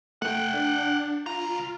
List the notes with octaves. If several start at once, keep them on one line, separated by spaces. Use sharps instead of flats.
A3 F#5 G5
D4
C#2 F4 A#5